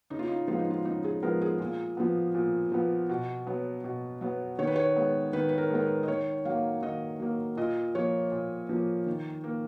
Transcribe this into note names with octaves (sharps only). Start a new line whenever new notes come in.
C#3 D#4
F4
D#4
F3 G#3 B3 F4
D#4
F4
C#3 D#4
G#4
F3 G#3 B3 A#4
G#4
A#2
F3 B3
A#2
F3 B3
B2
F#3 B3
B2
F#3 B3
D#3 C#5
B4
C#5
G#3 B3
D#3 B4
B4
A#4
G#3 B3 A#4
B4
D#5
D#3 C#5
F#3 A#3 F5
D#3 D#5
F#3 A#3
A#2 D#5
F3 A#3 C#5
A#2
F3 A#3
D#3
A#3